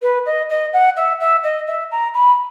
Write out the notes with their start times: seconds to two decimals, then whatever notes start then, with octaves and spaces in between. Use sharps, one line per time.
0.02 B4
0.25 D#5
0.49 D#5
0.73 F#5
0.96 E5
1.19 E5
1.43 D#5
1.67 E5
1.91 A#5
2.14 B5